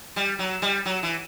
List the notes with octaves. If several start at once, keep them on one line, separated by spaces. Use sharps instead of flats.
G3
F#3
G3
F#3
E3